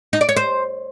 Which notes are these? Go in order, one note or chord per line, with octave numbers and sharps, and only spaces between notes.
D#4
D5
C#5
C5